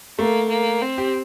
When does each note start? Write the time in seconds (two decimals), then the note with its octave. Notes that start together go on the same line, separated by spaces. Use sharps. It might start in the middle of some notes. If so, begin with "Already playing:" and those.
0.19 A3 A#3
0.50 A#3
0.82 C4
0.98 G4